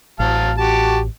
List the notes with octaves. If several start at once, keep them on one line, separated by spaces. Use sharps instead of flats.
A1 F#3 F5 A5
F#4 G4 A5